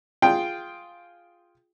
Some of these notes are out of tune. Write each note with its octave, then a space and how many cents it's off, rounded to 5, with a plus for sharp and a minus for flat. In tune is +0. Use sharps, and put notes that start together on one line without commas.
F4 +0 G#4 +0 G5 +0